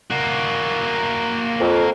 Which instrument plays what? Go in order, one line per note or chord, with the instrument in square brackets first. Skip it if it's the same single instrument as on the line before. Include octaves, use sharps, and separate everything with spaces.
[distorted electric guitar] A#3 F#4
[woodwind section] F2